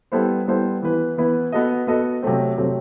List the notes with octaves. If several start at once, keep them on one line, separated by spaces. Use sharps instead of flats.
G3 B3 E4 A4 C5
G3 B3 E4 A4 C5
E3 B3 E4 B4
E3 B3 E4 B4
B3 F#4 A4 D#5
B3 F#4 A4 D#5
C3 F#3 A3 C4
C3 F#3 A3 C4